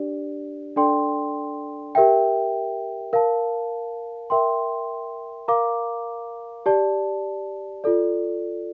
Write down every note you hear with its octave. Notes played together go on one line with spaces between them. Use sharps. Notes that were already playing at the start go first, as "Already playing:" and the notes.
Already playing: D4 G4 D5
D4 A4 D5 G5 C6
G4 A#4 E5 G5
A#4 F5 A5
A#4 E5 G5 C6
A#4 F5 A#5 D6
G4 D5 A5
F4 A4 D5